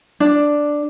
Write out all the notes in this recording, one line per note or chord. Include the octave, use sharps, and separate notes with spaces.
D4